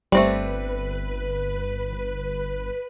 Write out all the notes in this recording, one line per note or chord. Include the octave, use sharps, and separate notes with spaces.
G1 G3 A3 C4 B4 D5